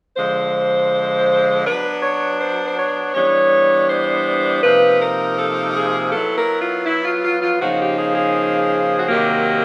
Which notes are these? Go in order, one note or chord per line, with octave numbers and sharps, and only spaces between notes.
D3 F3 G#3 C5
F#3 B3 D4 B4
C#5
C5
C5
C#5
E3 G3 B3 D4 C#5
C5
C3 F3 A#3 D#4 B4
A#4
A4
G#4
F#3 B3 E4 A4
A#4
F4
E4
F4
F4
F4
C#3 F3 A#3 D#4 F#4
G4
G#4
G#4
F#4
C3 D#3 F#3 A#3 G4